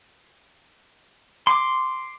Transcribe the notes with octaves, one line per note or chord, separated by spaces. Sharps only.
C6 D6